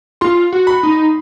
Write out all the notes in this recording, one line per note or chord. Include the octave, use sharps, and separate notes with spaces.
F4 C6
F#4
B5
D#4